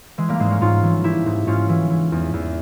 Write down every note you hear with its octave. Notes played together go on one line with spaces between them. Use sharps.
E3 G#3
G3 A#3
G#2 G#3 C4
A#3 C#4
G#2 C#4 F4
E3
E3 E4 G4
G#2
G#2 C#4 F4
E3
E3
E2
E2